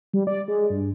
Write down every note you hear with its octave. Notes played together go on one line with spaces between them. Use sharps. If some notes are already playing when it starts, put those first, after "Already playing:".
G3
D5
G#3
G2